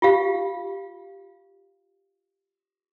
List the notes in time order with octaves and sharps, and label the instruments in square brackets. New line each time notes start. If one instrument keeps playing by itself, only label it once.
[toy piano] F4 G4 F5